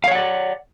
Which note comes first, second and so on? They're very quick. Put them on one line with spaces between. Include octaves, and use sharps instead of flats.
F5 C#5 F#5 D5